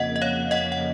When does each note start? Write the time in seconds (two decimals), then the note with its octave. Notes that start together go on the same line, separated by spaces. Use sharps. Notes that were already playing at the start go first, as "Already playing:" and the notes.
Already playing: F2 C#3 F3 A#3 D#5 F#5
0.16 D#5
0.22 C#5 F5
0.51 D#5 F#5
0.72 F#5